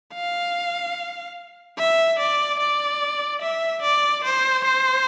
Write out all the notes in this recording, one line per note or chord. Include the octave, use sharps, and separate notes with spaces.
F5
E5
D5
D5
E5
D5
C5
C5